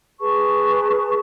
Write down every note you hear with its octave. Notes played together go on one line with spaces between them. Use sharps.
G#4 B4 A5 C#6